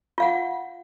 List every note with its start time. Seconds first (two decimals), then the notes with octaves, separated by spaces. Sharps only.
0.18 F4 F5 F#5